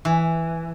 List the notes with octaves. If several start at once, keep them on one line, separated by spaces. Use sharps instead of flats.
E3